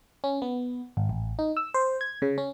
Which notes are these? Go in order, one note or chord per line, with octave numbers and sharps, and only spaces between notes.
C#4
B3
G#1
A1
D#4
E6
C5
G#6
C#3
C#4